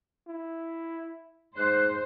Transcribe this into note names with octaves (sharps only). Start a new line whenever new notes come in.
E4
G#2 C5 F#6